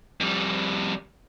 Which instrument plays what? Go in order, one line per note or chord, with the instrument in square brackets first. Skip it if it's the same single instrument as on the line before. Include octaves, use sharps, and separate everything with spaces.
[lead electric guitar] F2 G3